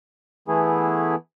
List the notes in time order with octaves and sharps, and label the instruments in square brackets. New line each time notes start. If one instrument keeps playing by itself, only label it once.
[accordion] E3 A3 B3 E4 G#4